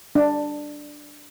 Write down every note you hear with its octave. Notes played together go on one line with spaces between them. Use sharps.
D4